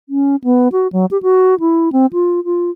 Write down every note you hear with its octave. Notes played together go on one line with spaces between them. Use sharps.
C#4
B3
F#4
F#3
G4
F#4
E4
C4
F4
F4